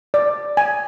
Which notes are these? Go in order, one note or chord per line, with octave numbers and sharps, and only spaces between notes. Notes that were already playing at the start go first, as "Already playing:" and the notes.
D5
G#5